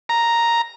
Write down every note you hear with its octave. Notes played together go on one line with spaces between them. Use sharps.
A#5